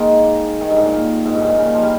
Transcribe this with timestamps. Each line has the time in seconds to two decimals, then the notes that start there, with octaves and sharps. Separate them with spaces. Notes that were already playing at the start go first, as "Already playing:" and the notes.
Already playing: D#3 G#3 A#3
0.61 D#3
0.70 G2
0.77 G#2
0.85 A#2
1.25 G#2
1.34 G2
1.41 G#2
1.49 A#2
1.58 C#3
1.65 D#3
1.74 F3
1.82 G3